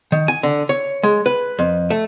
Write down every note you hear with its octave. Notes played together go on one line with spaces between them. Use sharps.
D#3
G#5
D3
C#5
G#3
B4
F2
A3